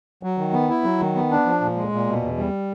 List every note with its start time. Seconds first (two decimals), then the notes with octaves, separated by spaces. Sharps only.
0.23 F#3
0.38 D#3
0.53 B3
0.70 E4
0.84 F#3
1.00 D#3
1.15 B3
1.31 D4
1.46 F3
1.61 A#2
1.76 G#3
1.92 A#2
2.06 B2
2.22 E2
2.37 G3